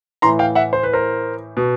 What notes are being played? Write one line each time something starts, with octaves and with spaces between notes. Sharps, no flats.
A2 E3 A#5 C6
F5 G5
E5 F#5
C5
B4
A#4 C5
B2